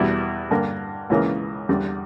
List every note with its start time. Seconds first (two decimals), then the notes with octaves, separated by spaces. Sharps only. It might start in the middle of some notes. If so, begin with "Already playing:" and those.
Already playing: E2 B2 G3 B3 E4
0.51 G2 D3 A#3
1.10 C#2 C#3 E3 A#3 C#4
1.69 E2 D3 G3